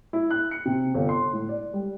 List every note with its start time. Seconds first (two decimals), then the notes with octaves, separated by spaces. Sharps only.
0.13 E4
0.30 F#6
0.51 C#7
0.65 C3
0.94 G1
1.09 C6
1.33 A2
1.49 D5
1.74 G3